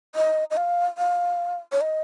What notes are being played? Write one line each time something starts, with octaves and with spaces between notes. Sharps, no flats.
D#5
D#5
F5
F5
C#5
D#5